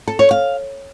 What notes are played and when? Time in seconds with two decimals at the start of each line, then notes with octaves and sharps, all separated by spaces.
0.08 A4
0.19 C#5
0.31 F5